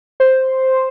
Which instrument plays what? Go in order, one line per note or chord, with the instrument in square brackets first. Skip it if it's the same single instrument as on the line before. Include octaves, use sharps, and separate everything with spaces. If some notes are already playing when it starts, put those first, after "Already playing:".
[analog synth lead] C5